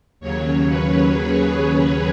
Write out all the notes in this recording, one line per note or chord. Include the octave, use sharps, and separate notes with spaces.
D#2 C#3 F#3 C#5
B4
G#4